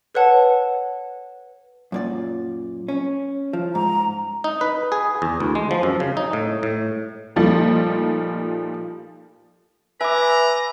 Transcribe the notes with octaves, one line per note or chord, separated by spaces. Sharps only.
A4 B4 C#5 F#5 A5
F#2 A#2 D5
C#4
F3
G#2 A#5
D#4
B4
G#4
E2
D2
G#3
F3
F#2
C#3
D#4
A2
A2
A#2 F3 G3 A3 D#4
B4 E5 G#5 A#5 D6